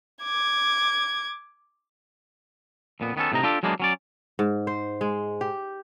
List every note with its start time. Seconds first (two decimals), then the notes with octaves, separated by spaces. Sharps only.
0.24 D6 G#6
3.00 F2 A#2 B3
3.16 D#3 B3 C#4 A4
3.32 A2 C3 D#4 A#5
3.43 D4 F4 G4 A4
3.63 F#3 G#3 A#3 B3 D4
3.80 F#3 C#4 D5
4.39 G#2
4.67 C5
5.01 G#3
5.41 G4